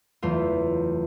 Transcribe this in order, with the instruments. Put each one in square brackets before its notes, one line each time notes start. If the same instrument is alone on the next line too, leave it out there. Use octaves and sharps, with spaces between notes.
[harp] F#1 E2 A3 F4